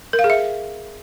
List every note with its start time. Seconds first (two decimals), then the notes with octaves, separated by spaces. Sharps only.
0.13 A#4
0.19 F5
0.24 G#4
0.30 E5